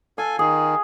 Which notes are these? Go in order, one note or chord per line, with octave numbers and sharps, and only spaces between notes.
A4 F5 G#5
D#3 G#4